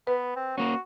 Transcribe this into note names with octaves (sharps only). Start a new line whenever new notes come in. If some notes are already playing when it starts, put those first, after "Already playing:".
B3 B4
C4
A#3 C#4 F#4